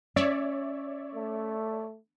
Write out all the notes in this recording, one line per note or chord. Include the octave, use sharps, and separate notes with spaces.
C#4 C#5 D5 E5
A3